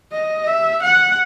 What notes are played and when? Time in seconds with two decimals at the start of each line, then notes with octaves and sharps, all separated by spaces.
0.12 D#5
0.47 E5
0.83 F#5